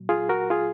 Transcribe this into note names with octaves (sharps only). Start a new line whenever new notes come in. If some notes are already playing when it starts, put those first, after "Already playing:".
Already playing: A#2 F#3
F4 G#4
F#4 A#4
F4 G#4